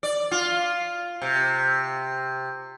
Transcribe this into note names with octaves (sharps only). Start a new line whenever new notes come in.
D5
F4
C3